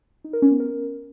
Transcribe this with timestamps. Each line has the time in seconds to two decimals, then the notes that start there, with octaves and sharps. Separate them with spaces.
0.24 D#4
0.33 A#4
0.42 C#4
0.51 B3
0.60 A#4